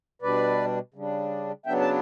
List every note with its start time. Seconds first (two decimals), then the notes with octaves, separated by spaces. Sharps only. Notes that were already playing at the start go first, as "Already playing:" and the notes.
0.22 B2 G3 D4 B4 D5
0.94 C#3 G3 D4
1.66 C#3 F#3 B3 D4 E5 G5
1.81 A5